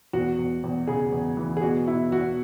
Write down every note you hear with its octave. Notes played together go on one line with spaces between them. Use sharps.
E2 F#4
E2
E2
C#3 G#4
E2
E3
G#4
B2 F#4
B2 E4
E2 F#4